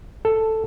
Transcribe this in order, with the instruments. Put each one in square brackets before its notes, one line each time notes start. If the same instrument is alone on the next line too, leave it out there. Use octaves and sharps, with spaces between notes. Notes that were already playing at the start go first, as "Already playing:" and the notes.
[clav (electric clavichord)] A4